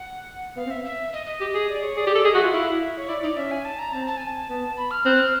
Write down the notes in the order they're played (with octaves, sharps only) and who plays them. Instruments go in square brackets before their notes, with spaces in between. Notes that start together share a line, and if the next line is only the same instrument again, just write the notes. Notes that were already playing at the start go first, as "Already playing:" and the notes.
Already playing: [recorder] F#5
[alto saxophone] B3 [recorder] F5
[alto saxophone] C4
[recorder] E5
E5
D#5
D#5
[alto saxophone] G4
G#4
[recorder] D5
C#5
[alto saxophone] G#4 [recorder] D5
[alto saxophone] G4
A4
[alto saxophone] G#4 [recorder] D#5
[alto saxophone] F#4
[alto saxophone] F4 [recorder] E5
[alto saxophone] E4 [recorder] F5
[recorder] E5
C#5
[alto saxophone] E4 [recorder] D5
[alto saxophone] D#4 [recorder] D5
[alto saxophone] C#4 [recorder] E5
[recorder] G#5
A5
A#5
[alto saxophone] C4 [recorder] A5
[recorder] A5
G#5
A5
[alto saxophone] B3
[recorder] B5
F6
[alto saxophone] C4 [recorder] F#6
[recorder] F6